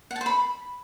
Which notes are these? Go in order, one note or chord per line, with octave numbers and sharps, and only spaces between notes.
F#5
A5
C5
B5